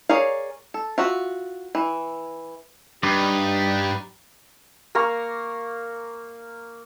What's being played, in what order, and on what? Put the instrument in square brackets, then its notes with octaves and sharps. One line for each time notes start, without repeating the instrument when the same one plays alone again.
[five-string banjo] G#4 A#4 C#5 D5 F5
A4
F4 F#4 E5
E3
[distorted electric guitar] G2 [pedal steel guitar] D#4 B4 D5 [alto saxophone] G4
[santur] A#3 F5 A#5 C#6